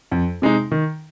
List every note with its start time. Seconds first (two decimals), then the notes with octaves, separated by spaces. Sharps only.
0.11 F2
0.42 C3 G#3 D#4
0.72 D#3